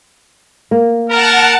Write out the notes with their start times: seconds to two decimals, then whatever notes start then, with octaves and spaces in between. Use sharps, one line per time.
0.71 A#3
1.10 A#4 F#5 A5